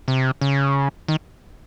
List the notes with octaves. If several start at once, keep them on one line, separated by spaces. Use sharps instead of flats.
C3
C#3
D#3